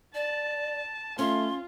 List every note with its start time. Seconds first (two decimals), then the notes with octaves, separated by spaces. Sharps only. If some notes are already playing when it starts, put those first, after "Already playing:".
0.15 D5 A5
1.19 A3 C#4 F4 C6